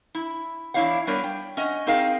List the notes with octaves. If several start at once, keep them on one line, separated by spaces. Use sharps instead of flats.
E4
E2 D4 E4 C#5 F5 F#5
G3 B3 D4 A#4 C#5
G5
C#4 D#5 F#5
C4 D#4 G#4 A#4 F5 G5